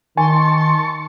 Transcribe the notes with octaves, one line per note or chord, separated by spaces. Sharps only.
D#3 G#5 A5 C6 C#6